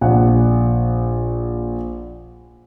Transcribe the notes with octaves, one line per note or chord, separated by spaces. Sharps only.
A#1 F#5